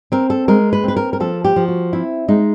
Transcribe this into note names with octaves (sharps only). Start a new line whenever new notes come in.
C4 A#4
A4
G#3 A#4
B4
C4 B4
A#4
A#4
F3 A4
G4
F3
F#4
C4 E4
G#3 D#4